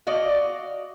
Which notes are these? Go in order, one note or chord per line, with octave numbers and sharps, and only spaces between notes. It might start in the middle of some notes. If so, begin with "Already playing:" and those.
F#4 D5 D#5 F5